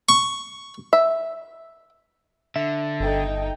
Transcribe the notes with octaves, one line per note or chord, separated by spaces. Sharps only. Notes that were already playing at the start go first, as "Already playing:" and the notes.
C#6
E5
D3 E5
G1 D#4 A4 G5